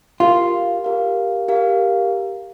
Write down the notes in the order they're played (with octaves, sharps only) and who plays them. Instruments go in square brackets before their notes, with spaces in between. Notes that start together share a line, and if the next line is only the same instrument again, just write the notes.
[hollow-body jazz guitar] F4 [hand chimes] G4 A#4 F5
[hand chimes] G4 A#4 F5
G4 A#4 F5